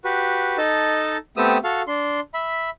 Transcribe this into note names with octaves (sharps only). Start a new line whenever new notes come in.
F#4 G4 B4
D#4 A4 D#5 A5
A3 B3 C4 G4 D#6 E6
F#4 A4 F5
D4 C6
E5 B5